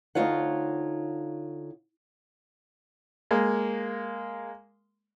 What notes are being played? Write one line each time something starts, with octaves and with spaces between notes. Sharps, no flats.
D2 G2 D#4 F4 C#5 F#5
G#3 A#3